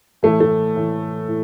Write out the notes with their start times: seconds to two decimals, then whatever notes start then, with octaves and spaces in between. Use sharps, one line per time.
0.23 A2 E3 A3
0.40 A3
0.76 A2 E3
1.28 A2